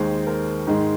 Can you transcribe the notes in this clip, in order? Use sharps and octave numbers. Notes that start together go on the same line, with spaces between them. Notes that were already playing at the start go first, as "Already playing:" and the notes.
Already playing: D#2 D#3 G#3 C5
A#4
G#2 D#3 G#3